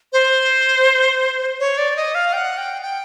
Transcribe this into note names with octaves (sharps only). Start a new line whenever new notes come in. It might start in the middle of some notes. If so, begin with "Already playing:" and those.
C5
C#5
D5
D#5
F5
G5
F#5
G5
G5